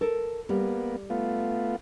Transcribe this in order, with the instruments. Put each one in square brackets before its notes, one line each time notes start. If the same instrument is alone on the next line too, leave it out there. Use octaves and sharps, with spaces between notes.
[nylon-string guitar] A4 A#4
[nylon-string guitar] G3 [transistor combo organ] A#3 B3
[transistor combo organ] A3 B3 F4